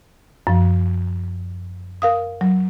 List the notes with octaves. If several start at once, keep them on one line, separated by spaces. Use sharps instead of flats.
F#2 F3
A#4 F5 D#6
F#3